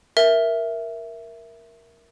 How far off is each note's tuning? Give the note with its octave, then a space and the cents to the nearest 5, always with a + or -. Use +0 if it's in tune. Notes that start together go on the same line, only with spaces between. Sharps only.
A#4 +5 E5 +0